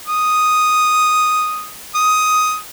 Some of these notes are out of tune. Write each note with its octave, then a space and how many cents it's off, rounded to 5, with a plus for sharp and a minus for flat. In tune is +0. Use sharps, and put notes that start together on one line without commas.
D#6 +0
D#6 +10